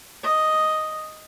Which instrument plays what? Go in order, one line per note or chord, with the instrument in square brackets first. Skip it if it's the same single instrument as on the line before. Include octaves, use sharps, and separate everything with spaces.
[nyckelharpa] D#5